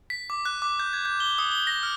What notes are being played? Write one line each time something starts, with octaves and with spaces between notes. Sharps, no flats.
B6
D6
F#6
D6
G6
G#6
G6
G7
D#6
G7
A#6
F6